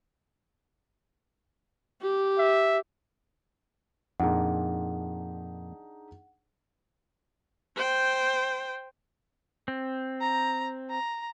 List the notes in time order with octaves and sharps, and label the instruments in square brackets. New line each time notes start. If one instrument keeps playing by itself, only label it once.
[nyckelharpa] G4
[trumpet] E5
[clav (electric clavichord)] F2 A#2 [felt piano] D4 D#4 G#4 [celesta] F#5
[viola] C5 G5
[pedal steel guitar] C4
[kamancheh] A#5
A#5